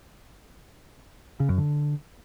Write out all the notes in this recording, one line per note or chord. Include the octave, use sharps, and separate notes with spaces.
C#3
F#2
D3